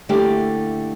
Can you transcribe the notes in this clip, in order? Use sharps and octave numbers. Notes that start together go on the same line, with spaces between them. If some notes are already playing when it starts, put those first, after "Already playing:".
D3 A3 A#3 E4 G4